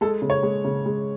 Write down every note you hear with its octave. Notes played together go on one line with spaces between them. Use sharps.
G#3 A4
C#3
C#5
G#3
C#3
G#3